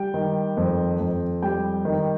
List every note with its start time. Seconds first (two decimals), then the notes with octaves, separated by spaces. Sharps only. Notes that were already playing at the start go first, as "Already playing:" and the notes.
Already playing: G3 G5
0.14 D#3
0.57 F2
1.00 F2
1.42 G3 G5
1.85 D#3